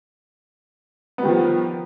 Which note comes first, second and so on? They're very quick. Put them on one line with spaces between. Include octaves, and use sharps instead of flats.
B3 G3 D#3 F3